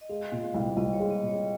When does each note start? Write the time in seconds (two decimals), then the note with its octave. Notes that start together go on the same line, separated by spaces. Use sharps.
0.01 D#5
0.09 G#3 F5
0.32 A#2
0.54 C2
0.77 C2 D#5
0.93 C#5
1.00 G#3
1.11 D#5
1.22 A#2
1.27 C#5